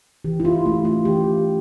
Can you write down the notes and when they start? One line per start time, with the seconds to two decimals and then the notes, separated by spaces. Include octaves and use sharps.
0.25 E3 G4
0.40 E4
0.45 F4
0.66 A3 C#4 F4
0.85 F4
1.05 E3 G4